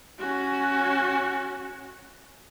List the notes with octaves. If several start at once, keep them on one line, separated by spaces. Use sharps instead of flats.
C#4 F#4